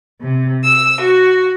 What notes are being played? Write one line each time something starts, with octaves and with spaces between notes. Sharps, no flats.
C3
E6
F#4